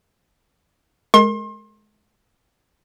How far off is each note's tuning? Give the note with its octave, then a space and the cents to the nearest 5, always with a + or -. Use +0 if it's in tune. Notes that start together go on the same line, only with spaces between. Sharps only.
G#3 +25 A#4 -15 C6 +35